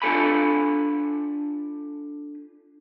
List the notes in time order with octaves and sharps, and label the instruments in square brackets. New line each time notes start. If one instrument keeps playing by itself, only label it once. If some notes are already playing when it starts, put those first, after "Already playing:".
[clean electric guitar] D4 F4 A4 G#5 B5